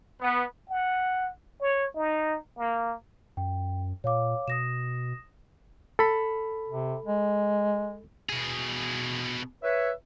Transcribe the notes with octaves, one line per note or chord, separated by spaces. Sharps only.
B3
F#5
C#5
D#4
A#3
F#2 G5
A#2 C#5 F5 D6
B2 D#6 A#6 E7
A4 B5
C3
G#3
B2 G#4
B4 C#5 E5